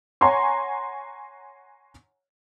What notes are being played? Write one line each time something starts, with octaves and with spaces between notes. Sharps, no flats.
C#5 F#5 G#5 A#5 C6 C#6